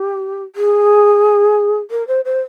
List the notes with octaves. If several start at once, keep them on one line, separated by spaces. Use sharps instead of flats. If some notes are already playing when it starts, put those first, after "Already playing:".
Already playing: G4
G#4
A#4
C5
C5